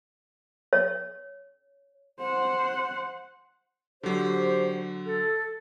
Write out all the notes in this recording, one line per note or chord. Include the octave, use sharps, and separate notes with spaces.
C#5
C5 F#5
D3 F#3 G4 C5
A4